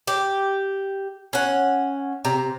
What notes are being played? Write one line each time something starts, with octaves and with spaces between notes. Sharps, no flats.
G4
C#4 F#5
C3 A#5